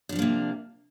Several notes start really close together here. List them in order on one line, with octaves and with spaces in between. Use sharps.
D4 F3 G3 A#3 C3